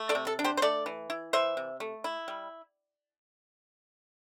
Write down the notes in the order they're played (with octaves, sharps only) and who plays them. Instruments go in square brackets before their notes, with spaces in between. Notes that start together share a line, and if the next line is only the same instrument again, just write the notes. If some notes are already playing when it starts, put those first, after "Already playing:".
Already playing: [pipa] A3
A4 D5
C3
A4
D4
G4 C5
C5
A3 A4 D5
E3
E4
E3 C5 E5
C3
A3
E4
G3